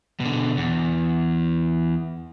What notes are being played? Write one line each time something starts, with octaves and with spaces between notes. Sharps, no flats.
B2 D3
E2